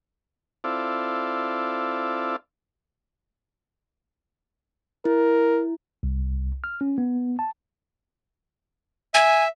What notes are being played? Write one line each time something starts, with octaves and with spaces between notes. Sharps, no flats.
C4 E4 F4 A4 D5
E4 A#4
C2
F6
C#4
B3
A5
E5 G#5